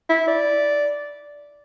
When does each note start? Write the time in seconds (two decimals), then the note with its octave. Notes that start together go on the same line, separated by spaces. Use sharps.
0.09 E4
0.27 D5